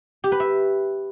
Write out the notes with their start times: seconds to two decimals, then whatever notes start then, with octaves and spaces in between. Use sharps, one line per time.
0.24 G4
0.32 B4
0.40 E5